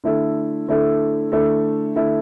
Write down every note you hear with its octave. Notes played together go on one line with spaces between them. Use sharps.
D3 A3 E4 A4
D3 A3 E4 A4
D3 A3 E4 A4
D3 A3 E4 A4